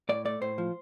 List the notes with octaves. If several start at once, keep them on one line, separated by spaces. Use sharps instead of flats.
A2 D5
A3 D5
A2 C5
F3